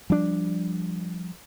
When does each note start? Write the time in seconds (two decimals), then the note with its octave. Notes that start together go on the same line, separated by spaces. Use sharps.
0.10 F3 G3 D4